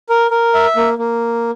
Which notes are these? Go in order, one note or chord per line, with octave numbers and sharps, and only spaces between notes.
A#4
A#4
E5
A#3
A#3